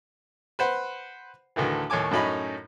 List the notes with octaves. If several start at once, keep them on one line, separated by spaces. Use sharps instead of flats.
B4 C5 F#5
D2 A2 D#3 E3
D#2 A2 C#5 G#5 D6
F#2 A2 C#4 D#4 B5